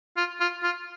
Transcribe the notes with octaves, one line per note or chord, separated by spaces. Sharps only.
F4
F4
F4